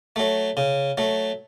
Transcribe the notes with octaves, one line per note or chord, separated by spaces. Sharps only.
F#3 A3
C#3
F#3 A3